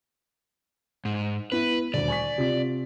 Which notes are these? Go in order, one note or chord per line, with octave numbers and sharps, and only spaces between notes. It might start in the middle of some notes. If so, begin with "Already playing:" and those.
G#2
B3 E4 B4
D#1 D2 D5
G#5 C#6 B6
C3 F4 B6